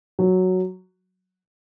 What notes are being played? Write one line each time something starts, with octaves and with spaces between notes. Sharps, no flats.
F#3